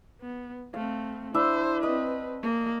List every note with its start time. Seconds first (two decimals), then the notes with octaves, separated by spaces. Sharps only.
0.21 B3
0.74 A3 C4 F5
1.34 D4 E4 C5 E5
1.83 C4 B4 D#5
2.43 A#3